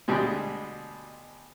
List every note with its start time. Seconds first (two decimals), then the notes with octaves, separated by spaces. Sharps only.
0.08 D2 B2 G3 G#3